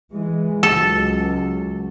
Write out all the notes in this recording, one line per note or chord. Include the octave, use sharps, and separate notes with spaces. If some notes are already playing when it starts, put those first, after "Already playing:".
E3 G#3
C#2 F#3 A4